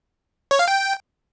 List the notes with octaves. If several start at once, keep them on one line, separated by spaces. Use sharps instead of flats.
C#5
F5
G5